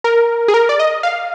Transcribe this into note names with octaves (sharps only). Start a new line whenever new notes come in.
A#4
G#4
A#4
D5
D#5
F5